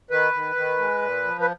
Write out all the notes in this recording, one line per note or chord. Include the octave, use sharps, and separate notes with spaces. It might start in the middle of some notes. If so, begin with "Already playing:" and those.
D#3 B4
D#3
D#3
G#3
A#2
F3
B4